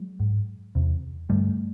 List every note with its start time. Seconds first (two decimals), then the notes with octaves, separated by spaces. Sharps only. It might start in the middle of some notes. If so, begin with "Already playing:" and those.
Already playing: F#3 G#3
0.20 G#2
0.75 E2 C3
1.29 G2 D3 G3 A3